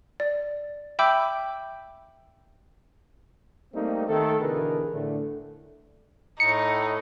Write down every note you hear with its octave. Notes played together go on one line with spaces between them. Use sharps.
D5
E5 G5 B5 D6 E6 G6
G3 A3 A#3 C4 D#4
D#3 A3 A4
B2 D3 E3 G#4 A#4 B4
A2 D3 A3
A2 D#4 C#7